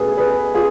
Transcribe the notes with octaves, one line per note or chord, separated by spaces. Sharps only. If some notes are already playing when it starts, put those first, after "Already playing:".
Already playing: B2 A3 G#4 B4 G#5
G#4 B4
F4 G#4